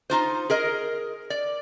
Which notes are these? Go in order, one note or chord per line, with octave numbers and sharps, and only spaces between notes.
D#4 F4 C5
G#4 A#4 D#5
D5